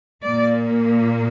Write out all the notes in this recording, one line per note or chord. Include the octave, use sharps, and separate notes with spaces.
A#2 A#3 D5